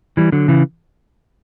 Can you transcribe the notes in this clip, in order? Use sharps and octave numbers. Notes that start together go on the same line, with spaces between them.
E3 G3
D3 F#3
C#3 E3